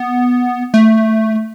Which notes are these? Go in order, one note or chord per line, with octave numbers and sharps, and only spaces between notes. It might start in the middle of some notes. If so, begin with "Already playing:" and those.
Already playing: B3
A3